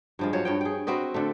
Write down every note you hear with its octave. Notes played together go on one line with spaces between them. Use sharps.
G2 F3 G#3
F3 F#3 C#5
G2 C#5 G5
G#4 G5
C4 F#4 B4 D#5
D3 A3